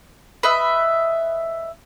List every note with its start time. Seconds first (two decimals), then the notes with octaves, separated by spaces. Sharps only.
0.43 B4 D#5 E5